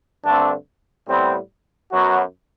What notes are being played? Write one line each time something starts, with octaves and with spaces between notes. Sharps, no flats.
G2 D3 A3 C4 D4
A2 G3 B3 C4
F#2 F#3 B3 F#4